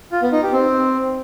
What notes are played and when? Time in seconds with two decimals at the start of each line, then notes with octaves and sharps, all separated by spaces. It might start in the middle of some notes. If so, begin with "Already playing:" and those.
0.12 F4
0.22 B3
0.32 D#4
0.43 G4
0.53 C4